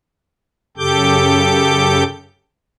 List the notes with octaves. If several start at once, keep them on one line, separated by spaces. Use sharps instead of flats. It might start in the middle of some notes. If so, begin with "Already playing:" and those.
F#2 C#3 G4 A4 D6 G6